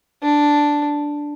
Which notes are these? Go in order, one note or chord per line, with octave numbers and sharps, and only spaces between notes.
D4